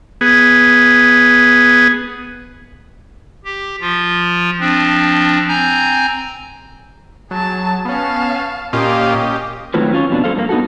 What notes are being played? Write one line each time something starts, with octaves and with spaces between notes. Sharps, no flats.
B3 G#4
G4
F3 F4
F3 C4 D4
C4 G#5 A#5 G6
F#3 G#4 A5
B3 C#4 F5 A5
A#2 A#3 C#4 F4 G4 D#5
D#3 F#3 A3 C4 F4 B4
C#4 F4 C#5
F2 B2 D4
G2 F3 A4 C5 F5
G2 A#3
B3 D#4 F4 F#4 A4